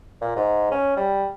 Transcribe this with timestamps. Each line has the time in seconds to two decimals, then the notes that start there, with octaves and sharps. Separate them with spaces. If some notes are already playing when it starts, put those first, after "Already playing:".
0.21 A#2
0.36 G#2
0.71 C#4
0.96 G3